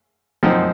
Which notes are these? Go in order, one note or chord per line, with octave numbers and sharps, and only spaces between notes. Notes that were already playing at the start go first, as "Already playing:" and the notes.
F#2 F3 C4 D#4